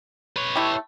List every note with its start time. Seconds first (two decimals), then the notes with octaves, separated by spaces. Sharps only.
0.36 B4 C#5
0.56 A3 E4 G4